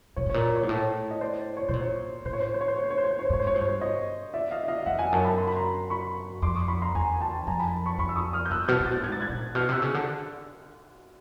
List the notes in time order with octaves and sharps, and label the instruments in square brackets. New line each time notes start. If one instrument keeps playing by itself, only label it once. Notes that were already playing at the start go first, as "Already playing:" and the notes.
[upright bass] A#2 [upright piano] C#5
[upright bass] A2
[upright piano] C#5
[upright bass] A#2
[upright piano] C#5
C#5
[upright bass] G#2
A2
[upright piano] D#5
C5 D5
C#5
[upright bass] B2 [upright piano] C5
[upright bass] A#2
[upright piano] C#5
[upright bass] A2 [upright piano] C5
[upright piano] C#5
C5
C#5
C5
C#5
C5
C#5
C5
C#5
C5
C#5
C5
C#5
C5
[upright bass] G#2 [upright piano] C#5
[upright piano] C5
C#5
[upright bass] G2 [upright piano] C5
[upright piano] C#5
C5
C#5 D#5
D5 E5
D#5 F5
E5
D#5 F5
F5
[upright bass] F2 [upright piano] E5 F#5
[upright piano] F#5 G#5
[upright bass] F#2 [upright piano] G5 A5
[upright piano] A5 B5
C6
B5
A#5 C6
B5 C#6
[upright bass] F2 [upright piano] C6 D6
[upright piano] C#6 D#6
B5 C#6
A#5 C6
[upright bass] E2 [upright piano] G#5 A#5
[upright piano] G5 A5
[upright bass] F2 [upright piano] G#5 A#5
[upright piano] A5 B5
B5 C#6
[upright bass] F2 [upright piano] B5 C#6
[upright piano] E6
C#6 D#6
D#6 F6
G6
[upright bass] G2 [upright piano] E6 F#6
[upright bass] B2 [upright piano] F6 G6
[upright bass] A#2
[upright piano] G6 A6
[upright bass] A2
[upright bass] G#2 [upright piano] G#6
[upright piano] A6
F#6 G#6
[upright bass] A#2
[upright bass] B2 [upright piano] F6 G6
[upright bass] C3 [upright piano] E6 F#6
[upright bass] C#3
D3